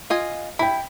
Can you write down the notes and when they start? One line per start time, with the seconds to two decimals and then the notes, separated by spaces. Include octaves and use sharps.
0.10 F4 D#5 G#5
0.59 E4 G5 B5